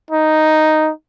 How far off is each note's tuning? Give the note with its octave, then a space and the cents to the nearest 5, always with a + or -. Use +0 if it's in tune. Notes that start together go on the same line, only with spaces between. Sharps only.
D#4 +0